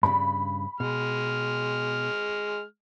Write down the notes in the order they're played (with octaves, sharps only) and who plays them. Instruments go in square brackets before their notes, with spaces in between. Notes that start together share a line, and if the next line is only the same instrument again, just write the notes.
[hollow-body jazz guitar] G2 A#2 C#3 [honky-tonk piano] B5
[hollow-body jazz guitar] B2 [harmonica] G#3 F6